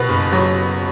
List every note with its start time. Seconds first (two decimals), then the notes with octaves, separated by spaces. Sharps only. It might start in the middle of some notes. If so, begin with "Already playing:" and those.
Already playing: B2 B3 B4
0.09 F#1
0.32 F#3